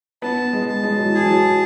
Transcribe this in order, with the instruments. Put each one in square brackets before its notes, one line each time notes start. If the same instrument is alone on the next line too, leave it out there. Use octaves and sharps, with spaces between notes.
[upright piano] B3 [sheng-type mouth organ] A5
[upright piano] G#3
[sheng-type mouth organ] A5
[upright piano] G#3
F#3
[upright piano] E3 [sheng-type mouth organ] G#4
[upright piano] F#3